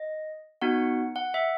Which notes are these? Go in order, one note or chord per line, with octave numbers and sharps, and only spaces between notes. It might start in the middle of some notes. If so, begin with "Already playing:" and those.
Already playing: D#5
B3 D#4 F#4 F#5
F#5
E5